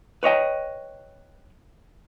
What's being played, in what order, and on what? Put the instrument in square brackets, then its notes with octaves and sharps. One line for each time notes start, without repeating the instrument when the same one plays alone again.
[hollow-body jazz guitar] B4 C#5 D#5 G5